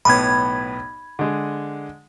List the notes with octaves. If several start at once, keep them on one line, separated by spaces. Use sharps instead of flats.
B1 A2 B3 B5 G#6
D3 G#3